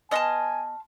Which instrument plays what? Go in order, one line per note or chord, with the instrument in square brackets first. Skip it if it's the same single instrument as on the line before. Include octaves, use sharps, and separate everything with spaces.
[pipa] B3 D#5 [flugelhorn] G#5 [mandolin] A5 C6 F6